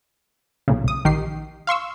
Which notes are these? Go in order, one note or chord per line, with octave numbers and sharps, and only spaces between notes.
B1 A#2 C#3
C2 D#6
A#1 D#3 G4 C7
F5 C6 C#6 E6